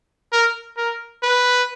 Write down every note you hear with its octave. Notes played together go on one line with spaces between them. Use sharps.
A#4
A#4
B4